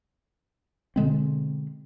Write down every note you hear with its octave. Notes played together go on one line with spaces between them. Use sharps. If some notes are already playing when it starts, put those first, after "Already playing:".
B2 D3 G#3 C4